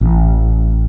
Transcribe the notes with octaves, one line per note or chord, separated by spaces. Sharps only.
A1